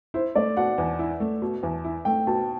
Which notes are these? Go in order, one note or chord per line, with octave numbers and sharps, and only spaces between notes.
E4 C5
A3 D5
B2 F#5
E2
E4
A3
B2
E2
E4
A3 G5
B2 A5